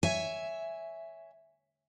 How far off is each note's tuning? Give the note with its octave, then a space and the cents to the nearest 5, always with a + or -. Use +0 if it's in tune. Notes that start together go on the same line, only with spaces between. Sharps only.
C#5 +10 E5 +0 G#5 +0